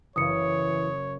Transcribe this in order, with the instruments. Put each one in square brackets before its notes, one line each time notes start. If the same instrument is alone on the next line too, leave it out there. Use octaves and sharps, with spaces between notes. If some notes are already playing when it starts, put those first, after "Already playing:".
[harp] F#1 [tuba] E3 [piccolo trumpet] C#5 [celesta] D#6 C#7